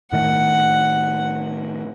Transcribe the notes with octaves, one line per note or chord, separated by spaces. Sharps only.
A2 D#3 A3 F#5